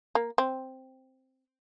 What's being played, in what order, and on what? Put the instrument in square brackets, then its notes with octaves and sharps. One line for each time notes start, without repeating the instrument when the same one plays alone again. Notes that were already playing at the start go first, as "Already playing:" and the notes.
[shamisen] A#3
C4